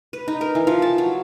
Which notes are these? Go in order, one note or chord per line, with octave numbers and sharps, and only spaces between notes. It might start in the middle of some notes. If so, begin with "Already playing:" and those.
B4
D#4
A#4
E3
F3
A5
F#3